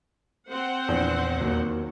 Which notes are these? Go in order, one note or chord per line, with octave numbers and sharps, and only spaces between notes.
C4 C5 F#5
A#1 E2
D#2 F#3